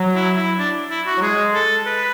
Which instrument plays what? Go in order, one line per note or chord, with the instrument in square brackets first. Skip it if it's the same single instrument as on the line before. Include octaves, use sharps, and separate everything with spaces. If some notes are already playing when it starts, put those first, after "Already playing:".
Already playing: [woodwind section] F#3
[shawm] E4
E4
D4
E4
F#4
[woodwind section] F#3
[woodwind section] G#3 [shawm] G#4
[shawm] A4
B4